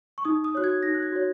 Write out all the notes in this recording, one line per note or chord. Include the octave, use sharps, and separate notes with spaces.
C#6
D#4 D#6
D#6
F#4 C#5 F#6
G#6
D#4 A#6
F#6
G#6
F#4 C#5